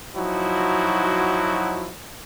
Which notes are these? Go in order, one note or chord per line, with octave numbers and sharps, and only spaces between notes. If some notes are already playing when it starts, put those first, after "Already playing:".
F3 F#3 D#4 E4 F#4